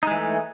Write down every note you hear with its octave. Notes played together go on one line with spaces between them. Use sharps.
E3 G#3 A3 D#4